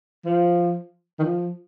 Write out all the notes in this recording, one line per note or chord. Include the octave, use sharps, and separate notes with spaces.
F3
D#3
F3